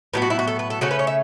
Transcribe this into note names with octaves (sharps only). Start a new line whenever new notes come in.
A2 F#3 B3 B4
F#4
E4
F#4
A4
B4
A4
C#3 A3 C#4 F#4
B4
C#5
E5